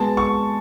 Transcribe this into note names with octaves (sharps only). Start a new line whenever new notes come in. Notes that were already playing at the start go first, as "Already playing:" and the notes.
Already playing: B2 G#3 B3 A5
C#6